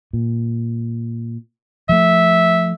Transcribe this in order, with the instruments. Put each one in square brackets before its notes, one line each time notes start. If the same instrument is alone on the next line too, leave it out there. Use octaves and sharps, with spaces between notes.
[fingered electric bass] A#2
[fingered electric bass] F3 A3 [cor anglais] E5